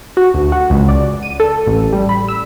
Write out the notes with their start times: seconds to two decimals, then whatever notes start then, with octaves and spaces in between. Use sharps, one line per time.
0.17 F#4
0.34 D2
0.52 F#4
0.70 C#2
0.88 D5
1.23 D#7
1.40 A4
1.67 A1
1.93 G3
2.09 B5
2.28 E6